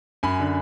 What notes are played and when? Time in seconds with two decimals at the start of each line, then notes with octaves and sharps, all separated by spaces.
0.23 F#2 G#5 B5
0.40 D3